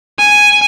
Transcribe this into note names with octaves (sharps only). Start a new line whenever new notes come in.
G#5